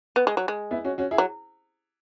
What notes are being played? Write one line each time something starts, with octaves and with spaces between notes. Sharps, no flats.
B3
G#3
F#3
G#3
B3 E4
C#4 F#4
C#4 F#4
E4 G#4
F#3